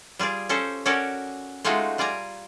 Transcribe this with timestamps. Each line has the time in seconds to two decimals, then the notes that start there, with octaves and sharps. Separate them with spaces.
0.19 G3 F4 G#4 D5
0.49 C#4 G4 A4 C5
0.86 C#4 F#4 A4 A#4 C#5 D5
1.64 G#3 A3 D#4 F4 F#4
1.98 G3 F4 D5 G#5 A#5